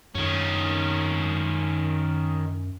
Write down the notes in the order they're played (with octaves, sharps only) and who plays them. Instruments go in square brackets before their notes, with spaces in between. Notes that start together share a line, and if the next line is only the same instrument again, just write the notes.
[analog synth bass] F#2 [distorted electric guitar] D#3 C#4